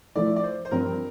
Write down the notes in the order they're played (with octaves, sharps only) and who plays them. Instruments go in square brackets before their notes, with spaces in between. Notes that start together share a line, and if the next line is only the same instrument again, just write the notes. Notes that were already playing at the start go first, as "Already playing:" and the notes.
[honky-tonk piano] F3 A3 E4 [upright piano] D5
[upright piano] D5
C5
C5
[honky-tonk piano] G2 F3 C4 [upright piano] A#4